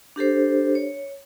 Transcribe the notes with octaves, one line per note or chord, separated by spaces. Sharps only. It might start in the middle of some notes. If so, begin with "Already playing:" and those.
D4 G4 A4 C5
C#5